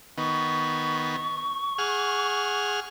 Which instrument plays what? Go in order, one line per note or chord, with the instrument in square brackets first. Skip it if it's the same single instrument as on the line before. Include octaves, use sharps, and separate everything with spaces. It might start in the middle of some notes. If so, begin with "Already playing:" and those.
[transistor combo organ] D#3 B3 [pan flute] C#6
[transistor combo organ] G#4 F#5 F6